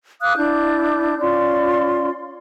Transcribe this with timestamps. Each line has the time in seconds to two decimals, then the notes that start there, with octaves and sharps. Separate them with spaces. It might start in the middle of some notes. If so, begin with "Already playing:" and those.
0.21 F5 D6 D#6 F#6
0.37 D4 E4 G6
1.19 C#4 F4 D5 C6